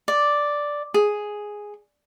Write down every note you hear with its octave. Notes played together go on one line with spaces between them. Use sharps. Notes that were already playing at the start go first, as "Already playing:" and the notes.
D5
G#4